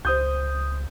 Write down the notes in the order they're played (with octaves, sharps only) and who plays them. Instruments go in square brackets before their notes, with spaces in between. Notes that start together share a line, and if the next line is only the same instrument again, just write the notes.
[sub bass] C#2 [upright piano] C5 D#6 G6